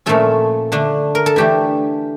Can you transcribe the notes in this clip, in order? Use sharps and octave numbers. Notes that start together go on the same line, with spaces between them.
A#2 F3 A3 C#4 A4
D3 A3 D4
A#4
A4
E3 A3 D4 G4